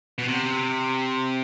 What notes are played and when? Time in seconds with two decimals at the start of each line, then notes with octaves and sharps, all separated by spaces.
0.18 B2
0.28 C3